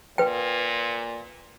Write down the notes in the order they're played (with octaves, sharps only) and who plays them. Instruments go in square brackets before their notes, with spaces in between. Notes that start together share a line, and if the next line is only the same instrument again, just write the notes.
[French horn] A#2 [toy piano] B4 G5